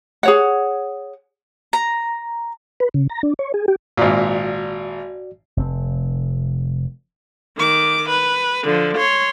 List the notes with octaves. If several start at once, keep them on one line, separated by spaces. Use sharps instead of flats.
G#4 C#5 F#5
A#5
B4
C#3
A#5
D4
C#5
G#4
G4
G#1 A#2 F#4 D5
F1 C4
D#3 D6
B4
D3 F3
C#5 C6